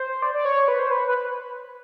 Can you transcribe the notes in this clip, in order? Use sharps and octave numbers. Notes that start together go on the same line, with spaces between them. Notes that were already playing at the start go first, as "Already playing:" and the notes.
Already playing: C5
D5
D5
C#5
B4
C5
B4
B4